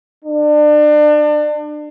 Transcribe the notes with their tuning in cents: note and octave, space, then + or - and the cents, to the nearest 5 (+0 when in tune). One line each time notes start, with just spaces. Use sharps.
D4 +30